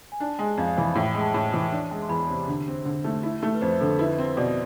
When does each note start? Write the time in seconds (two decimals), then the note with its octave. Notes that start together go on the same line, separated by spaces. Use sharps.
0.12 G#5
0.20 D4 A5
0.39 G#3 G#5
0.57 F2 F5
0.67 G#5
0.77 E3 B5
0.95 A2
1.14 G#3
1.21 A5
1.34 A2
1.53 E3
1.72 D4
1.91 G#3
2.02 C6
2.09 E2 B5
2.29 C3
2.48 D3
2.67 C4
2.85 D3
3.04 A3
3.23 E4
3.43 A3
3.55 B4
3.61 F2 C5
3.81 D3 A4
3.99 E4 B4
4.18 C4
4.37 B2 D5